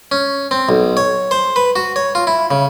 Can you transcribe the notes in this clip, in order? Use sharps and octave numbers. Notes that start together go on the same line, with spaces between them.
C#4
C4
B1
C#5
C5
B4
F#4
C#5
F4
E4
C#3